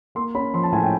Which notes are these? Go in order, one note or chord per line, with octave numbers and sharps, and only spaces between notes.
A#3 C6
C#4 B5
F3 C6
A5
A2 G#5
G5